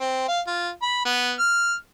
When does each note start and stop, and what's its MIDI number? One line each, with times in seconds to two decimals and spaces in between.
0.01 0.28 60
0.28 0.40 77
0.48 0.70 65
0.82 1.01 83
1.05 1.33 59
1.39 1.74 89